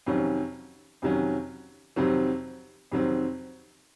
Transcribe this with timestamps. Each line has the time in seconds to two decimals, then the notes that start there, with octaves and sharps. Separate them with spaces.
0.06 F2 C3 D#3 F#3 C#4
1.02 F2 C3 D#3 F#3 C#4
1.96 F2 C3 D#3 F#3 C4
2.92 F2 C3 D#3 F#3 C4